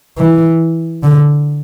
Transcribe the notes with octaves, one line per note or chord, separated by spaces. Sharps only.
E3
D3